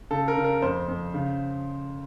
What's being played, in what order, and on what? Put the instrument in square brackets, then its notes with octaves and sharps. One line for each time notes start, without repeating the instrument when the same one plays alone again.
[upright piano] C#3 A4
A#4
C#3
A#4
F2 C5
F2
C#3